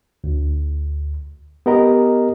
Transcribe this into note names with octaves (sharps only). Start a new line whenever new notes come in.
D2
B3 G4 A#4 D#5 A#5